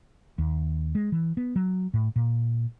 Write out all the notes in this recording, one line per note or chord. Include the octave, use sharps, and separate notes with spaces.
D#2
G#3
E3
B3
F#3
A2
A#2